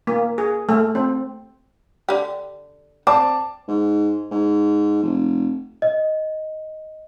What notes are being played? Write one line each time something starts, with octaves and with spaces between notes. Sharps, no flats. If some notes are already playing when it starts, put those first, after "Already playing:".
A#3
G#4
A3
C4
D3 G4
C4 D5 A5 D6
G#2
G#2
F1
D#5